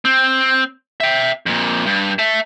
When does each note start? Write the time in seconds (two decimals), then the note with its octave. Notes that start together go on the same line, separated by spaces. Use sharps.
0.05 C4
1.00 E5 G5
1.46 F2 A#2
1.86 G2
2.19 E5 A5